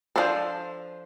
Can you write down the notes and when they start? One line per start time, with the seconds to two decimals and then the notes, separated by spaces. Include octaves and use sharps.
0.16 F3 A3 D4 A4 C5